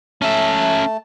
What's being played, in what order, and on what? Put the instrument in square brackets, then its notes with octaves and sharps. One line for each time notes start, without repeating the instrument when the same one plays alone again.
[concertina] A3 A5 [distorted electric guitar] C#4 E5